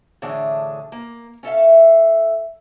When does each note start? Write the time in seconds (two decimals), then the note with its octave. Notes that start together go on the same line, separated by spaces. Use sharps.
0.22 A2 D3 E3 D4 G#4
0.92 A#3
1.43 C#4 A4 E5 F5